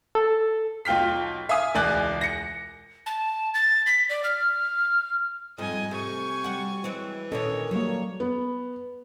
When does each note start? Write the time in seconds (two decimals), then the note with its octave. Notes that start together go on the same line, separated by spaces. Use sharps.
0.15 A4
0.85 B1 F4 G5 F6 B6
1.49 E5 F5 G#5 D#6
1.74 E1 C#2 D5 G#5 F#6
2.21 A#6 C#7
3.06 A5
3.54 A6
3.86 B6
4.09 D5
4.24 F6
5.58 F2 G#2 G3 D#5 G#5
5.91 C3 A3 G#5 C#6
6.44 G3 F#4
6.84 E3 F#3 G#3 C4
7.32 A#2 D3 D#3 C#4 A4 C#5 D#5
7.71 D#3 F#3 G3 A#3 C#5
8.20 B3